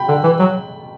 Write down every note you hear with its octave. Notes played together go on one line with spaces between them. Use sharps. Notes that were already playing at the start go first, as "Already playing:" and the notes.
Already playing: G5 B5
D3
E3
F#3